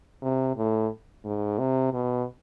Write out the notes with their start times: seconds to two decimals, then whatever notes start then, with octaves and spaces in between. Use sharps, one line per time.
0.22 C3
0.57 A2
1.25 G#2
1.59 C3
1.93 B2